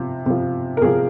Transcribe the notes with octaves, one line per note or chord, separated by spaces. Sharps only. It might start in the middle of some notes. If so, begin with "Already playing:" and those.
Already playing: C3 F3
C3 F3
A#4
C3 F3 G#4